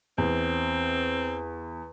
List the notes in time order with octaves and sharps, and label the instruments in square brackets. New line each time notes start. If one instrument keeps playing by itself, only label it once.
[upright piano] E2 [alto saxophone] C4